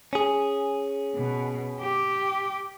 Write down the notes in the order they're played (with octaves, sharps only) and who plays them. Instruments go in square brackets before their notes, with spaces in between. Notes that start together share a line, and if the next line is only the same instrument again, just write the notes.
[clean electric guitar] C#4 G#4
[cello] B2
G4